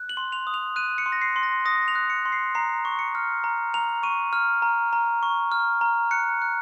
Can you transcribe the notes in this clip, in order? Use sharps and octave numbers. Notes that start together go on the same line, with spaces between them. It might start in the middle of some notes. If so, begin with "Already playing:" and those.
Already playing: F#6
F#7
C6
F7
D#6
F7
F#6 D#7
C#7
C6
A#6
C7
C6
A#6
D#6 A#6
F7
F#6
C#7
C6
C7
A#5 C7
C#6
C#7
F6
A#5
A#5 F7
C#6 D#7
F6
A#5
A#5
C#6
F6
A#5
F#6 C#7
F#6